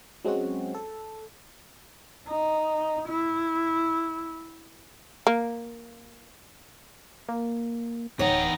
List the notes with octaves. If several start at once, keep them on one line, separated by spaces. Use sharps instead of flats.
F#3 G#3 C4 C#4 F#4
A4
D#4
E4
A#3
A#3
D1 E2 D#4 C#5 F#5 G5